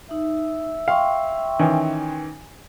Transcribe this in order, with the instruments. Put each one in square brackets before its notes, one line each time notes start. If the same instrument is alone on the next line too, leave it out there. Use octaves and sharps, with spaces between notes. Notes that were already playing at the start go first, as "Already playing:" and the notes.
[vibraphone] D#4 [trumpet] E5
[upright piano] F5 [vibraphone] G5 C6 C#6
[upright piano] D#3 E3 C#4